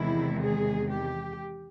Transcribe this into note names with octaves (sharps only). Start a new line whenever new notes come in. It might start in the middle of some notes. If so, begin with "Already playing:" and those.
Already playing: E2 C3 D#3 G#3 E4
G#4
G4